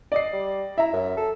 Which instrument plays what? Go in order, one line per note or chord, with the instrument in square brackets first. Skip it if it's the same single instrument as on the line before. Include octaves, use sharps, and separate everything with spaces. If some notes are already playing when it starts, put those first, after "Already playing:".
[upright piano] D5 D#5 C7
[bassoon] G3
[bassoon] E4 [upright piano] E5 A#5
[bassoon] F#2
A4